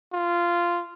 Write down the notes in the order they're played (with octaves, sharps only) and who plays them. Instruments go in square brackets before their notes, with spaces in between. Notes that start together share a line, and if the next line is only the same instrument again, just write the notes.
[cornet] F4